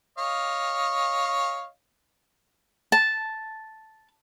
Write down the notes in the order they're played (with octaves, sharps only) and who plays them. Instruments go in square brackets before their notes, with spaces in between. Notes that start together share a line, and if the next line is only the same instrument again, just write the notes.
[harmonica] C#5 D#5 F5
[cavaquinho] A5